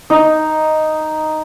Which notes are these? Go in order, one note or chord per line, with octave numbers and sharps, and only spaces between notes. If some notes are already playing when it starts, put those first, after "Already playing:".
D#4